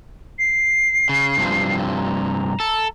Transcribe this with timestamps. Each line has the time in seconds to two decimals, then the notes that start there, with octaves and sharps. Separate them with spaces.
0.39 C7
1.09 C#3
1.37 G2 C3 F3
1.97 A#5
2.60 A4